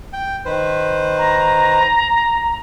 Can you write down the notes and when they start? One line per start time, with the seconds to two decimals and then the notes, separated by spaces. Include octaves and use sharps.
0.13 G5
0.45 D#3 B4 C5
1.18 A#5